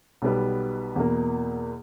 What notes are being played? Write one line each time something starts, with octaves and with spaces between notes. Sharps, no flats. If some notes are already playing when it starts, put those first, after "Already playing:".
B1 B2 G3 B3
E2 B2 A#3